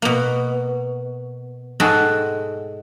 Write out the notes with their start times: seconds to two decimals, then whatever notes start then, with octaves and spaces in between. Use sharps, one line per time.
0.02 B2 A#3
1.80 G#2 G#3 F#4 A4 G5 G#5